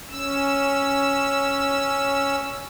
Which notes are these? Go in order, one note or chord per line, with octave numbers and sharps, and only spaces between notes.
C#4 E6